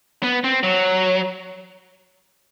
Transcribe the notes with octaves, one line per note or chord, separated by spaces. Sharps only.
B3
C4
F#3